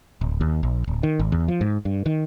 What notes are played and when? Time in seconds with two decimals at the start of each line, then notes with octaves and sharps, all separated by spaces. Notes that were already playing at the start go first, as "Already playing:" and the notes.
0.21 D1
0.41 D#2
0.63 A#1
0.87 D1
1.03 D#3
1.20 G#1
1.32 E2
1.48 F3
1.61 G#2
1.85 G2
2.06 D#3